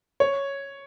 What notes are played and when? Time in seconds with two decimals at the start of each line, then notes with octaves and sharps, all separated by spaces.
0.20 C#5